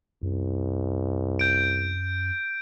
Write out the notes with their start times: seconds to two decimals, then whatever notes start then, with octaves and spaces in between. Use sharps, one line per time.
0.23 C2 F#2
1.39 G6 D7